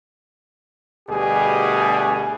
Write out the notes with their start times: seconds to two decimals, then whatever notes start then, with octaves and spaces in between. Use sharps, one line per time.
1.09 D2 B2 G3 G4 G#4